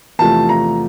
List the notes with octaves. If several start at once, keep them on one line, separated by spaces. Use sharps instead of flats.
E2 C3 F3 A3 A5
A#5